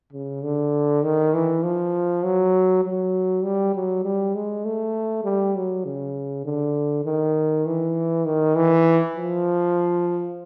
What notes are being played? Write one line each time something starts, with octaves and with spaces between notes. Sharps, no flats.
C#3
D3
D#3
E3
F3
F#3
F#3
G3
F#3
G3
G#3
A3
G3
F#3
C#3
D3
D#3
E3
D#3
E3
F3